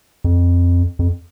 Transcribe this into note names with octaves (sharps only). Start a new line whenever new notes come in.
F2
F2